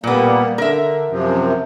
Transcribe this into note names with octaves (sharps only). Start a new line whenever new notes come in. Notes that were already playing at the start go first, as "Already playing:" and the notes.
A#2 G3 A#3 B3
D3 A#4 E5
F#2 C3 F3